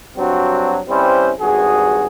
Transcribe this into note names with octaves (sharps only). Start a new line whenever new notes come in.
G2 F#3 C4 D4 F#4
G3 C4 C#4 E4 B4 C5
G#1 G2 F#4 G#4